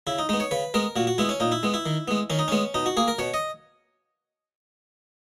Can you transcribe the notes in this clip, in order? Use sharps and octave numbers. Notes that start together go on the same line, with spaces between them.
C#3 E4
D#4
G#3 B3 D#4
C#5
C#3 B4
G#3 B3 A#4
A#2 F#4
F#4
G#3 B3 E4
C#4
A#2 D#4
E4
G#3 B3
E4
D#3
G#3 B3
D#3 C#4
D#4
G#3 B3 C#4
B2 D#4
F#4
A#3 G#4
A#4
B2 C#5
D#5